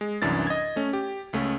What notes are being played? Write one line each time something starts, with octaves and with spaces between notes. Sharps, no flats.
G#3
C2 F#2 E3 D4 A6
D#5 G#6
A3 C#4
G4
C#2 A3 C#4 A4